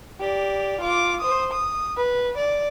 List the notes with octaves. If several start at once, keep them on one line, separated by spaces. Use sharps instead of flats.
G4 D5
F4 D6
C5 D#6
D#6
B4
D5